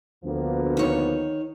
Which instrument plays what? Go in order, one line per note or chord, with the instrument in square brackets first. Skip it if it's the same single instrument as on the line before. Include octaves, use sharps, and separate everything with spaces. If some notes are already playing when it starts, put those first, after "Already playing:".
[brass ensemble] D2 [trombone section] F3 A#3 B3
[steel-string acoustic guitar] D#3 C#5